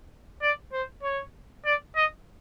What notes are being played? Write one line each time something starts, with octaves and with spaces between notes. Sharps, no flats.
D5
C5
C#5
D5
D#5